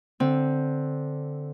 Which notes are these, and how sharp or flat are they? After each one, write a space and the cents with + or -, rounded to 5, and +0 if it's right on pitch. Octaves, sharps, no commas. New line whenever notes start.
D3 +0 C4 +0